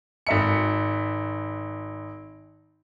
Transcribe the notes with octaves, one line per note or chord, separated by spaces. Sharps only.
G#1 E5 C#7